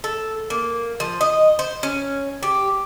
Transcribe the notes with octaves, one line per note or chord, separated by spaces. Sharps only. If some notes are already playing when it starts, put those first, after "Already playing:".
A4
A#3
F3
D#5
C5
C#4
G4